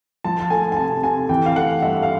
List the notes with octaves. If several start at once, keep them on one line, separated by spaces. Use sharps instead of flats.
F3 A5
A5
A3 G#5
G#5
C3 A5
C3 G#5
E3 G5
F5
A3 F#5
G2 E5
F5